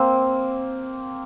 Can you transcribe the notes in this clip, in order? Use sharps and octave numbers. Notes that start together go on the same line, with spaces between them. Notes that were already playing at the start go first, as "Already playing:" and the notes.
Already playing: A#3 C4